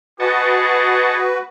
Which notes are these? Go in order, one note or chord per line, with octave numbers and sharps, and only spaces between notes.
F#4 G#4 B4 D#5 A5 C#6